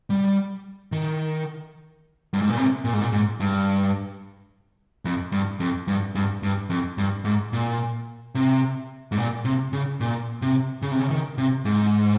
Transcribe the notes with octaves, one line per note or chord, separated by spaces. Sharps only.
G3
D#3
G2
G#2
A#2
C3
A#2
G#2
A#2
G#2
G2
F2
G2
F2
G2
G2
G2
F2
G2
G#2
A#2
C3
G#2
A#2
C3
C#3
A#2
C3
C#3
C3
C#3
D#3
C3
G#2